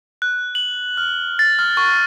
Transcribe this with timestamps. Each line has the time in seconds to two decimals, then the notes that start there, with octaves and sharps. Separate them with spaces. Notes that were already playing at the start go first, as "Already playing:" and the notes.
0.22 F#6
0.55 F#7
0.97 F6
1.39 A6
1.59 F6
1.77 C#6